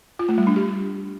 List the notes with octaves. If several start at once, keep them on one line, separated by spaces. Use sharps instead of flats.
F4
A3
G3
D4
G4